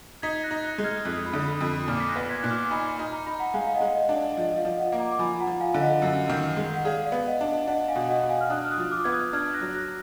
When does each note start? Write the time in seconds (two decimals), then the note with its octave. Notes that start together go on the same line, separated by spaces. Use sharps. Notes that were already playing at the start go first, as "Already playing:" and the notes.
0.22 D#4 G#6 B6
0.43 F#6 A#6
0.51 D#4
0.64 F#6 A#6
0.78 G#3
0.84 F6 G#6
1.05 F2 D#6 F#6
1.26 B5 D#6
1.34 D3
1.47 B5 D#6
1.61 F2
1.88 A#2 D6 F6
2.00 B6
2.09 F#6 A#6
2.16 B3
2.29 G#6 B6
2.43 A#2 F#6
2.51 D6 F6
2.70 D#4 G#5 B5
2.99 D#4
3.12 A#5
3.26 D#4 B5
3.39 F#5 A#5
3.54 G#3 F5 G#5
3.67 F5
3.75 D#5 F#5
3.81 G#3
3.95 D#5
4.09 D4
4.16 D5
4.37 F3 D#5
4.51 D#5
4.57 D5 F5
4.65 F3
4.77 D#5 F#5
4.92 A#3
4.99 A#5 D6
5.12 D6
5.19 F3 G#5 B5
5.40 F#5 A#5
5.47 F3
5.60 F5 G#5
5.74 D3
5.81 D#5 F#5
6.02 F#2
6.30 D#3
6.57 G#3
6.74 F#5
6.85 G#4 D5 F5
7.06 D5 F5
7.12 B3
7.27 D#5 F#5
7.41 D4
7.47 D#5
7.67 D4 D#5 F#5
7.88 F5 G#5
7.96 B2
8.09 D#5 F#5
8.23 B2
8.29 F5 G#5
8.41 F6
8.50 D4 D#6 F#6
8.65 F6
8.71 D#6 F#6
8.78 F3
8.91 D6 F6
9.04 B3 G#6
9.12 D#6 F#6
9.33 D4 F6 G#6
9.54 F#6 A#6
9.61 F#3
9.74 F#6 A#6